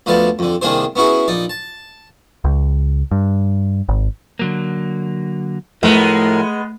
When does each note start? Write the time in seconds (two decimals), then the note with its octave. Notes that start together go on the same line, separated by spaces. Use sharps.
0.06 D2 D3 F3 B3 F5 A5
0.39 F2 D3
0.62 C2 D#3 A#3 D4 G#4 C5
0.96 B3 C#4 E4 F#4 G#4
1.28 A#1 D#4 D5
1.50 A5
2.44 C#2
3.11 G2
3.89 G#1
4.39 D3 F#3 A#3
5.83 A2 F3 G#3 A3 B3 E4 F#4 A#4